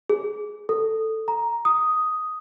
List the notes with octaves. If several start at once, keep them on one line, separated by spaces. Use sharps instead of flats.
G#4
A4
A#5
D#6